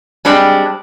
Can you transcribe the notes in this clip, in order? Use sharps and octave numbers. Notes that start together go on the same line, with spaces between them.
G3 G#3 C4 D4 G4